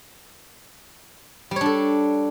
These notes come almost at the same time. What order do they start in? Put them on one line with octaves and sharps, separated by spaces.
G3 C#5 D4 A4